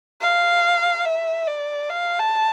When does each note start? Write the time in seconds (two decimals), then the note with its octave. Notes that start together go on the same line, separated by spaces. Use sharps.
0.21 F5
1.05 E5
1.47 D5
1.90 F5
2.19 A5